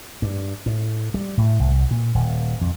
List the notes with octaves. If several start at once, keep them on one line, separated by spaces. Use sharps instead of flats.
G2
A2
G3
A2
C2
A#2
D#1
F2